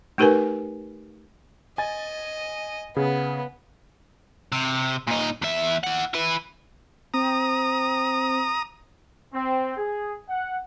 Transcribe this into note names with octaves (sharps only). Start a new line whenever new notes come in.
A3 D#4 G4 A#4 B4 G#5
D#5 G#5 A6
C#3 B3 G#4
C3
A#2 D#4
E2 E5
E4 F#5
E4 B4
C4 A#5 D#6
C4
G#4
F#5